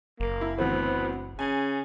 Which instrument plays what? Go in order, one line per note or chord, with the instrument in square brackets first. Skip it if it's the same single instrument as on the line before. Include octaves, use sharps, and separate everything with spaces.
[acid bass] F#1 [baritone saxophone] A#3
[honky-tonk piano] E4
[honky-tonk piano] D2 E3 C4 [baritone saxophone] B3
[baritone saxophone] C#3 [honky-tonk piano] G#5